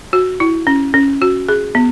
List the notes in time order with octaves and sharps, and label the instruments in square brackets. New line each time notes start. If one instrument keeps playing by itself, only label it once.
[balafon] F#4
E4
C#4
C#4
F#4
G#4
B3